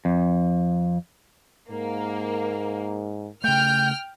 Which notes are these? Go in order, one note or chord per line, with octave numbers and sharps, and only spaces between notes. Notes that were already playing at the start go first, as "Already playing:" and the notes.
F2
G#2 A#3
C#3 A3 G5 F6 G6